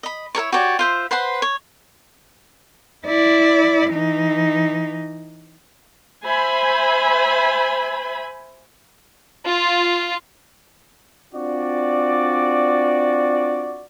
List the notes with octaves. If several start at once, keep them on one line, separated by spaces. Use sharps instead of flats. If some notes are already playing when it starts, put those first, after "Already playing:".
D#5 B5
E4 A#4 C#5 C#6
F#4 G4 C#5 D5
F4 C5 E5
B4 C5 F#5 C6
C#5
E4 D5
E3 D#4
C5 E5 G#5 B5
F4
C4 D4 F4 F#4 D5